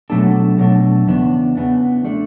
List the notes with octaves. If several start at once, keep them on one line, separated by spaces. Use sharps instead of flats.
B2 F#3 A3 D4 A4
B2 F#3 A3 D4 A4
E2 C#3 B3 D4
E2 C#3 E3 B3 D4
A3 D4 A4 D5